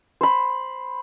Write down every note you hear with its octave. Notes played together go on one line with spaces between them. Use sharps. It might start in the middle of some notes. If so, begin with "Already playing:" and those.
C5 B5